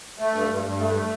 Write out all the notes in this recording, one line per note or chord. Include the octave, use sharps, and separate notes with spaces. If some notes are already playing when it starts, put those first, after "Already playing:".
A3
G2
G2
G2
A3
A3